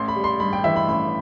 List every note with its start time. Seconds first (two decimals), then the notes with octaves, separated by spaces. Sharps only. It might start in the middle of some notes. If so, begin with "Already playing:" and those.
Already playing: A1 C6
0.08 B5
0.16 G3
0.24 C6
0.40 G2 B5
0.53 G5
0.64 E3 E5
0.76 B5
0.88 A1 B5